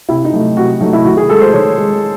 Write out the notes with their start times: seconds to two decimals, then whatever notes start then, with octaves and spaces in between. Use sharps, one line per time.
0.09 C3 E4
0.25 D#4
0.32 F#3 A3
0.57 C3 F#4
0.81 F#3 A3 D#4
0.93 E4
1.05 D#3 F#4
1.17 G#4
1.29 G#3 A4
1.41 C5
1.54 D#3 C#5
1.78 G#3